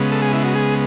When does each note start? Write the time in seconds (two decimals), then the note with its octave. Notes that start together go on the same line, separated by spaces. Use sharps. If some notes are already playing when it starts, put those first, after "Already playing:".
Already playing: C#3 G#3 B3
0.11 A4
0.22 G#4
0.33 E4
0.44 F#4
0.55 G#4